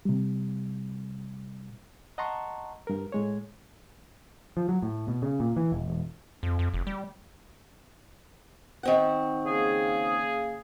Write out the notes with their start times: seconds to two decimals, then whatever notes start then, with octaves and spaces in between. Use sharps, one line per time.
0.05 C3 G3
2.18 D#5 F#5 A5 A#5 C6 C#6
2.87 G2 A#4
3.12 A2 G#3 C#5
4.57 F3
4.69 F#3
4.82 A2
5.08 B2
5.22 C#3
5.40 A#2
5.56 E3
5.72 E1
5.88 E1
6.43 F2
6.59 F2
6.74 F1
6.87 G3
8.83 D#3 C4 F#5
9.46 C#3 A#3 G#4